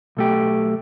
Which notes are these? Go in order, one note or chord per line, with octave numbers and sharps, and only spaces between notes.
B1 A3 G4